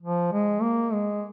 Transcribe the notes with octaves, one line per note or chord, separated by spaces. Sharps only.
F3
G#3
A#3
G#3